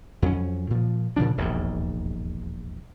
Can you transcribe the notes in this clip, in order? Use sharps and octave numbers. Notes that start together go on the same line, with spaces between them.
F2 F#3 C#4
A#2 F3
A#2 C#3 F3 D4
E1 A#1 D#2 G#2